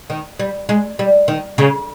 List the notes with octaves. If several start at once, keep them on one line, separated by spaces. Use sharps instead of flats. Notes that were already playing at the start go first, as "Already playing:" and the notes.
D#3
G3
G#3
G3
D#3
C#3